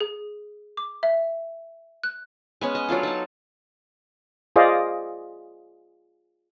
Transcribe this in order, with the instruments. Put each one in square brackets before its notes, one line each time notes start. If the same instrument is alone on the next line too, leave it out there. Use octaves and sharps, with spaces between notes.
[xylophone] G#4
D6
E5
F#6
[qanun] G#3 B3 C#4
D#5
F#3 D4 F4 A4
D#4 A5
[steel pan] F4 G#4 C5 D5 D#5 F5